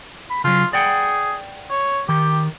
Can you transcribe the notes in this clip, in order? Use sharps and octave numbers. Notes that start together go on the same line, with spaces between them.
B5
C#3 F#3 F4
G#4 D5 F#5 G5
C#5
D#3 G4